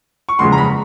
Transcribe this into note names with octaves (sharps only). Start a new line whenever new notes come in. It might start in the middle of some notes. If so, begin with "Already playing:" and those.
C#6
F#1 E2 C#3 F3 G#3 C6
A#5
B5